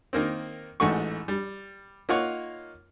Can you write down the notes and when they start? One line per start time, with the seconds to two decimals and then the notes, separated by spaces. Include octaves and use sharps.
0.13 D#3 A#3 C4
0.80 A1 G#2 A3 F#4 C#6
1.28 G3
2.09 A#3 D#4 F4 C#5 F#5 C#6